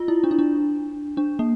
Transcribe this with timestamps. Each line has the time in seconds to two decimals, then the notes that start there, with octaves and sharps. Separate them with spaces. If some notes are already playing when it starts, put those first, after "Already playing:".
Already playing: F4
0.08 E4
0.24 D4
0.31 E4
0.39 D4
1.17 D4
1.39 A#3